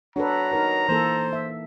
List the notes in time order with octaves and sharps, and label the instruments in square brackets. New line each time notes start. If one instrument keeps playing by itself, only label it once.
[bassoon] F#3 [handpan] D4 A4 B4 [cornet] A#5
[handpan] D#4 A#4 B4
[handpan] E3 A#3 A4 [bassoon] C5
[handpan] E5